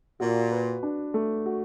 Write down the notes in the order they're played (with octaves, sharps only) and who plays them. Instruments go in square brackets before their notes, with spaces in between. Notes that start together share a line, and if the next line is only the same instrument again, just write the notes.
[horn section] A#2 [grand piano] F#4
[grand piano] B4
D4
A3
F#4